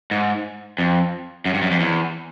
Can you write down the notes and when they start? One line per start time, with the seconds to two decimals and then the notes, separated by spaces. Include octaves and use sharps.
0.11 G#2
0.78 F2
1.46 F#2
1.54 G2
1.62 F#2
1.71 F2
1.80 E2